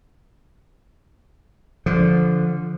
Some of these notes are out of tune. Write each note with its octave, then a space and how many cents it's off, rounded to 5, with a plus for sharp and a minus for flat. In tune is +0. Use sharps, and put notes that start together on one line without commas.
D3 -20 F3 -10